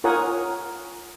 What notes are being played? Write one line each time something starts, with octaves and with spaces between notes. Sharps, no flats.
F4 A#4 C#5 F#5 G#5 D#6